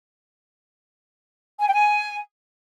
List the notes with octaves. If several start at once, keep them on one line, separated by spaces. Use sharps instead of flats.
G#5
G5
G#5